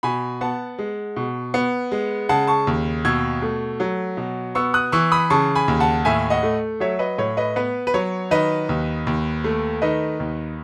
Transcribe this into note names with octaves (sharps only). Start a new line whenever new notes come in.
B2 G#5 B5
B3 F#5 A5
G#3
B2
B3
G#3
C#3 F#5 A5
A5 C#6
D#2
B2 E6 G#6
A3
F#3
B2
B3 C#6 E6
D#6 F#6
E3 C#6 E6
B5 D#6
C#3 A5 C#6
G#5 B5
D#2
F#5 A5
A2 E5 G#5
D#5 F#5
A3
F#3 C#5 E5
B4 D#5
A2 C#5
B4 D#5
B3 B4
B4
F#3 C#5
D#3 B4 D#5
D#2
D#2
A3
D#3 B4 D#5
D#2